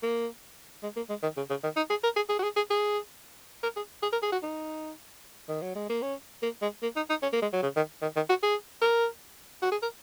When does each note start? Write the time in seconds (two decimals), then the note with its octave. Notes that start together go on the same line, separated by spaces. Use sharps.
0.03 A#3
0.83 G#3
0.96 A#3
1.09 G#3
1.23 D#3
1.37 C#3
1.50 C#3
1.63 D#3
1.76 D#4
1.90 G#4
2.04 A#4
2.16 G#4
2.29 G#4
2.39 F#4
2.43 G#4
2.57 G#4
2.70 G#4
3.63 A#4
3.76 G#4
4.03 G#4
4.13 A#4
4.23 G#4
4.32 F#4
4.43 D#4
5.49 D#3
5.62 F#3
5.75 G#3
5.90 A#3
6.02 C#4
6.43 A#3
6.62 G#3
6.83 A#3
6.96 D#4
7.10 D#4
7.22 C#4
7.33 A#3
7.42 G#3
7.53 F#3
7.63 C#3
7.76 D#3
8.02 D#3
8.16 D#3
8.29 F#4
8.43 G#4
8.82 A#4
9.62 F#4
9.72 G#4
9.82 A#4